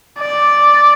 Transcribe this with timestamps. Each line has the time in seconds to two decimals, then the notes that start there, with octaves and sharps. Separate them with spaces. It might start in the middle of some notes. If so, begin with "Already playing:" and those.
0.19 D5